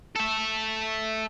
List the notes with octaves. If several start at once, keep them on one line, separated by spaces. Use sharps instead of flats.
A4 E5